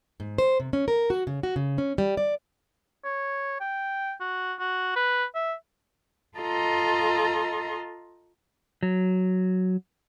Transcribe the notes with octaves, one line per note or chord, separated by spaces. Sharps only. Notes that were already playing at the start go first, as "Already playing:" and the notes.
G#2
C5
C3
C#4
A#4
F#4
C#3
F#4
C#3
C#4
G3
D5
C#5
G5
F#4
F#4
B4
E5
F4 A4 D#5 A#5 C6
F#3